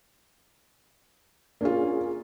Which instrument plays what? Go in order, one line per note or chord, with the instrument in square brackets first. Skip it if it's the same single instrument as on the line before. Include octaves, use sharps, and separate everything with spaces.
[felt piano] A#3 C#4 F4 [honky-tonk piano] D4 G#4